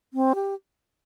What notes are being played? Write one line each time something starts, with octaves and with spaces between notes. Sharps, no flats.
C4
G4